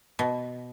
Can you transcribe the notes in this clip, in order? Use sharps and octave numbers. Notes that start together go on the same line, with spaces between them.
B2